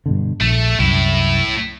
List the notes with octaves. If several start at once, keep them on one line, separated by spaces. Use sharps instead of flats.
G2 B2 D3
A#1 A3
C2 F#2 A2 E4